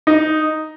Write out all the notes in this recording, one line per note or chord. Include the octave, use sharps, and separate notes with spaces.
D#4